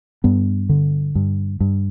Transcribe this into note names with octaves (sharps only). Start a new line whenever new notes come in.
G2 B3
D3
G2
G2